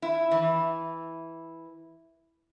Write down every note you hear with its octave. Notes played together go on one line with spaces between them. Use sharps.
E4
E3